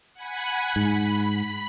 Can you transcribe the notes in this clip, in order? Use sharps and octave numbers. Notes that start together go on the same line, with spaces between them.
F#5 G#5 B5
G#2 B5